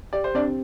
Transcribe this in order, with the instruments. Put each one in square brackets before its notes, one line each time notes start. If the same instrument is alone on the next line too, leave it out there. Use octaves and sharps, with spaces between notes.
[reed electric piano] G4 [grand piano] D5
[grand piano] C5
[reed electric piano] C4 [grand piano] D4 D5